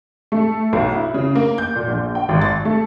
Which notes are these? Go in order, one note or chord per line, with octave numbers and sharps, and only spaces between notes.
A3
B1
E4
C#3
A#3
G6
A#2
A#1
G5
G#1
A6
A3